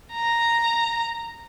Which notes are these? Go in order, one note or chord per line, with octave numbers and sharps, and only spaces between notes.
A#5